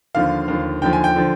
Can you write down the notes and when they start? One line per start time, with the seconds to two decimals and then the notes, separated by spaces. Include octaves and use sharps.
0.15 D#2 D3 F3 F5
0.48 D#2 D3 F3
0.82 D#2 D3 F3 G5
0.93 G#5
1.04 G5
1.16 D3 F3